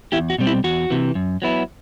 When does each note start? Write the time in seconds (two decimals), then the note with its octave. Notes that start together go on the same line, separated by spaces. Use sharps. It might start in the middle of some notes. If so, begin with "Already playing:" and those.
0.12 E2 E4 G4
0.30 F#4
0.38 B2 G3 C4
0.47 E4
0.64 E2 F#4
0.90 C3 E3
1.15 F#2
1.42 F#3 B3 E4